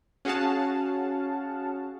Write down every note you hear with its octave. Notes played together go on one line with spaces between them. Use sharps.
C#4 F#4 G#4 F5 F#5 A5